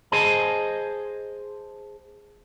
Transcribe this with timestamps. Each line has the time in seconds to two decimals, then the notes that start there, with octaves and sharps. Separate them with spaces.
0.12 G#4 C5 D#5 G#5 A5